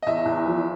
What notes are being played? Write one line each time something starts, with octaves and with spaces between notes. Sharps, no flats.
D#5
E2 E5
E2
F3